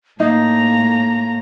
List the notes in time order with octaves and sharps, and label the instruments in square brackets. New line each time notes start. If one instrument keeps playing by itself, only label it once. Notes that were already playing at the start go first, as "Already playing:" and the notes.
[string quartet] A2 A#5 [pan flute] A#3 [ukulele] D#4